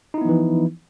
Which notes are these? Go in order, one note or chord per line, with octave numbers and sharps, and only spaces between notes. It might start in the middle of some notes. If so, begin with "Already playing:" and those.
E3 F3 B3 D#4 E4